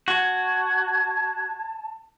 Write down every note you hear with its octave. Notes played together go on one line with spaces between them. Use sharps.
F#4 A5 G#6